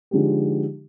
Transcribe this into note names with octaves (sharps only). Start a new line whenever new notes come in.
D3 F3 G#3 D#4 G4